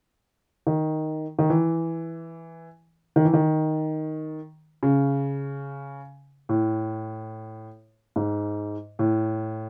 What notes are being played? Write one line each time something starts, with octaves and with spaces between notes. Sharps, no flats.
D#3
D#3
E3
D#3
E3
D#3
C#3
A2
G#2
A2